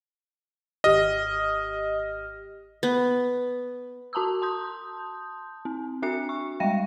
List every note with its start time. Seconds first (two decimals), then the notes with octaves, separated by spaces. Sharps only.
0.84 G#1 G4 D#5 F6
2.83 B3
4.13 F#4 A5 A#5 D#6 E6
4.42 A5 C6 D#6 G6
5.65 C4
6.02 D4 F#4 E5 F#6 C#7
6.29 C#6
6.60 G3 G#3 F5 G5 A#6